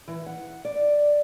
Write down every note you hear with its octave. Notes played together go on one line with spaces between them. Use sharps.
E3
F#5
D5